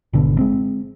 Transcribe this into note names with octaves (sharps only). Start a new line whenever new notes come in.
G#1 B2 D3
G#3 C4